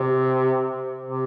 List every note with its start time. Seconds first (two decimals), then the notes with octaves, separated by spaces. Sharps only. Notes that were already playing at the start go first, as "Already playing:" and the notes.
Already playing: C3
1.06 C3